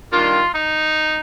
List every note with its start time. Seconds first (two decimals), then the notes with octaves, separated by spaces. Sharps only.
0.11 D#3 G3 A#3 D4 F4
0.52 D#4